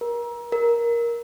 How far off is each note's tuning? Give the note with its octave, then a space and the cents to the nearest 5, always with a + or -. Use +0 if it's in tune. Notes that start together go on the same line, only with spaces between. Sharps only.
A#4 +30
A#4 +10